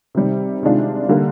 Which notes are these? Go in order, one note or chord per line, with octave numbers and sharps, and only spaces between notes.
C3 D#3 G3 C4
C3 D#3 G#3 D4 F4
D3 G3 A#3